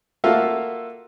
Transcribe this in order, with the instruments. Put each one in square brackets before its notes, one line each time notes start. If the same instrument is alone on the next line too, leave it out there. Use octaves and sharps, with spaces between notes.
[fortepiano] A#3 F4 F#4 A4 E5 F5